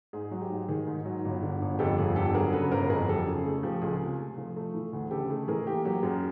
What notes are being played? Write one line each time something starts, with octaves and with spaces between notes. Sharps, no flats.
G#2 G#4
F#3
G4
G#2
D#3 G#4
G#2
F#3
G1
D3
G1
F2 G4 A4
G4
G1 G#4
D3 G4 A4
F#3 G#4 A#4
C#3 A4 B4
G1 A#4 C5
F2 G#4 A#4
G#4
F#3 G4 A4
C#3 G#4
A3 G#4
F3 G4
A4
C#2 G#4
C3
A3
F3
A3
E3
D2
C#3 G4 A4
A3 G#4
E3 G#4 A#4
A#3 G4
F#3 G4
F#2 G#4